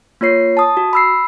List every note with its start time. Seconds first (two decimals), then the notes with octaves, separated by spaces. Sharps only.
0.21 A#3 F4 C#5 C7
0.57 A5 D#6
0.77 F#4
0.93 B5 E6 C7